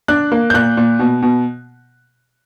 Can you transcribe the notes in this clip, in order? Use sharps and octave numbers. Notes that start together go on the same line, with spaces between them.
D4 F#6
A#3
G6
A#2 F#6
A#2
B2
B2